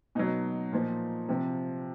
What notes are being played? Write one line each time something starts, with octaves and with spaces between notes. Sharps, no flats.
B2 F#3 D#4
A#2 F3
C3 F3